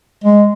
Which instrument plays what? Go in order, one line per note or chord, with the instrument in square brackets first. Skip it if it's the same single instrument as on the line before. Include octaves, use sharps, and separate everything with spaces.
[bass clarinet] G#3